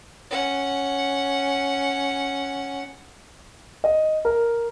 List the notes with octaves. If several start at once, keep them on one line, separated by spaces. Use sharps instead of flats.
C#4 F#5
D#5
A#4